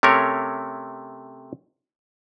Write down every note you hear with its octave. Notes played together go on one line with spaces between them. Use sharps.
C3 A3 C#4 A#4 C#5